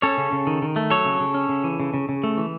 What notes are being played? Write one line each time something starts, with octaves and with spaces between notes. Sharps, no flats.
C#4 A4 C#5
C#3
C#3
D#3
D#3
A3
F#3 A4 C#5
C#3
C#3
C#4
C#3
E3
C#3
C#3
C#3
A3
E3